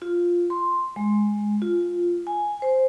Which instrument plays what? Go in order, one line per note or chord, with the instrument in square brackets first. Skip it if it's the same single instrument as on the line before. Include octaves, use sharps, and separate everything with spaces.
[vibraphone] F4
C6
G#3
F4
G#5
C5